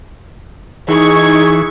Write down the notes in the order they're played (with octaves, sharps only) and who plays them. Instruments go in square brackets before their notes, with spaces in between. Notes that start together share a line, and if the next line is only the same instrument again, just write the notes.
[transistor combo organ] E3 [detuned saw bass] D#4 [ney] G#4 [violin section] C#6